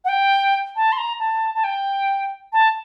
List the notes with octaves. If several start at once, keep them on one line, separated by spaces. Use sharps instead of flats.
F#5
G5
A5
C6
A#5
A5
A5
G5
A5